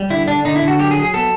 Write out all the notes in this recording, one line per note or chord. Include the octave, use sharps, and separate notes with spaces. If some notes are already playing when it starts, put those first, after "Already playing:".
Already playing: G3
D3 E4
D3 D4
D3 D#4
E4
D3
F#4
F#3 G4
G#4
F#3
G#4
B3 A4